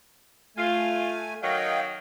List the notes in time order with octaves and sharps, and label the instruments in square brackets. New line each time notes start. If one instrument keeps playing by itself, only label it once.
[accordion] A3 G#5 [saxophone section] F4
[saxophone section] D#3 F#3 [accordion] D#5 F5 G5